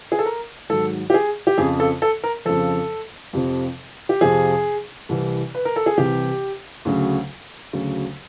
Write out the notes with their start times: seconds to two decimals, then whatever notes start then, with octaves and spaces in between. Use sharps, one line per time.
0.12 G#4
0.19 A4
0.26 A#4
0.69 G#2 D#3 F#3 A4
1.10 G4
1.14 G#4
1.47 G4
1.58 F2 C#3 F3 G#4
1.80 A4
2.02 A4
2.23 A#4
2.45 F2 C#3 F3 A4
3.33 F2 C3 F3
4.09 G4
4.21 F2 C3 F3 G#4
5.09 C2 C3 E3
5.55 B4
5.65 A#4
5.76 A4
5.86 G#4
5.97 C2 C3 E3 G4
6.85 D2 C#3 F#3
7.73 D2 C#3 F#3